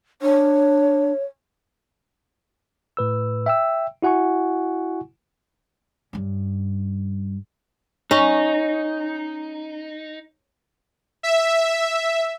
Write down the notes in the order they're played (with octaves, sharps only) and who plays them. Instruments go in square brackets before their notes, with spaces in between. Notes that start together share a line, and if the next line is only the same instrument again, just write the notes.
[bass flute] D4 [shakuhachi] C#5
[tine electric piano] A2 B4 E6
E5 G5 E6
E4 F#4 F#5 G#5 C#6
[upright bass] G2 C#4
[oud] C#4 [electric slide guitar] D#4
[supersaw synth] E5